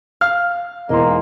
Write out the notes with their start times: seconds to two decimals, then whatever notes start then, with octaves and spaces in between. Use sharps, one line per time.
0.21 F5 F6
0.89 E1 G#2 A#3 E4 A#4 D#5 C6